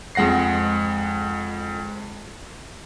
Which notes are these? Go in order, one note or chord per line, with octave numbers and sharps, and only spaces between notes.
F2 G#3 F#5 A#6 C7